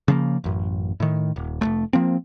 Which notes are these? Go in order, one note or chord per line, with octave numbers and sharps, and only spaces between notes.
C#3 F3 G#3 A#3
A1 F#2
A2 D#3
D#1
F1 D#2 A3
F3 A#3 C4